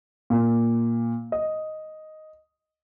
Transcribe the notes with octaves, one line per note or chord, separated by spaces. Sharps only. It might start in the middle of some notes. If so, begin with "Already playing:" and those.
A#2
D#5